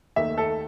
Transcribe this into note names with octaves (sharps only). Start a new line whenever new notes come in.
D#2 D#3 A3 E5
A4